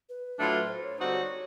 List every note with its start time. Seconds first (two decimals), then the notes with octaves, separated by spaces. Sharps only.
0.09 B4
0.39 A2 F#3 A3 D4 F4
0.69 C5
0.83 C#5
0.98 D3 G3 C4 D#4 F#4 C5
1.13 C#5